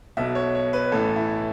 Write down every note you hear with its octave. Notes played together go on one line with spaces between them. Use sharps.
B1 B2 E5
C#5
C#5
B4
A1 A2 E3 A4
E4